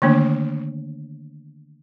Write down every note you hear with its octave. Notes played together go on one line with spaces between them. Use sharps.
D3 D#3 A3 A#3 D4